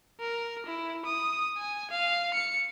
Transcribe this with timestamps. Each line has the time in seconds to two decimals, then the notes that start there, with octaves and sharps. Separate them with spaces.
0.20 A#4
0.66 E4
1.05 D#6
1.57 G#5
1.91 F5
2.34 C#7